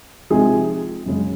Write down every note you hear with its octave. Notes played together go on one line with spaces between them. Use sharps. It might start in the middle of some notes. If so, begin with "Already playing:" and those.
C3 F3 G#3 D#4 G#4
F#2 C#3 G#3